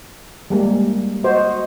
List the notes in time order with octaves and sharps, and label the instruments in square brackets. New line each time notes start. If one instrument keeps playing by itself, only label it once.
[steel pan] G3 G#3 A#3
[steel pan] F#4 C5 [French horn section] D#5